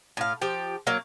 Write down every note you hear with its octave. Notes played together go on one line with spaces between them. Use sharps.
A2 F5
F3 G4
F#3 A#3